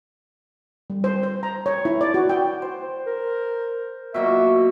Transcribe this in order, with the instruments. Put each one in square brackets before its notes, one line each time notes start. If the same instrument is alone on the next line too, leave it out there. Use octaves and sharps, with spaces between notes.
[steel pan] G3
C5
C5
A#5
C#5
E4
D5
F#4
G5
[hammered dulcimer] C5
[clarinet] A#4
[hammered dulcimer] B2 F#3 A#3 [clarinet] E5